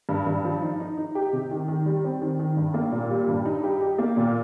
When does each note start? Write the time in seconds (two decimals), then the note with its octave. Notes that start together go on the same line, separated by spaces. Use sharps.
0.09 G2
0.27 G2
0.45 F3
0.62 D#4
0.80 D#4
0.97 D#4
1.15 G4
1.33 C3
1.51 D#3
1.68 D#3
1.86 G3
2.04 C4
2.21 D#3
2.39 D#3
2.57 G2
2.74 A#3
2.92 A#2
3.10 G3
3.28 G2
3.46 D#4
3.63 G4
3.81 G4
3.98 A#3
4.17 A#2